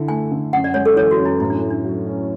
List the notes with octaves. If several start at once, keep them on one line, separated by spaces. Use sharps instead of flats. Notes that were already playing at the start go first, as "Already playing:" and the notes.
Already playing: D3 E4
A3 G#5
D3
F#2 F#5
D5
G#3 C#5
A4
E3 C#5
F#4
F#2
E4
A2 E4
D4
A3
D4
F#3
C#4